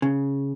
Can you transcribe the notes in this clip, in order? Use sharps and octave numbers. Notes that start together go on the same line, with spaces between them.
C#3